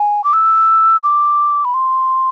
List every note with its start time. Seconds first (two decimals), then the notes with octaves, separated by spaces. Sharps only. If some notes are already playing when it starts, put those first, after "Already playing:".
Already playing: G#5
0.24 D6
0.33 E6
1.03 D6
1.65 B5
1.74 C6